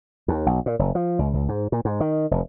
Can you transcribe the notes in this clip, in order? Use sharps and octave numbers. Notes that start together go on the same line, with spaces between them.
D#2
B1
A#2
F#1
F3
C#2
C#2
G#2
A#2
G#2
D#3
F1